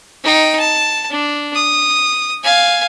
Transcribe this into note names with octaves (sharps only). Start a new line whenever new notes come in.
D#4 G5
A5
D4
D#6
F5 G#5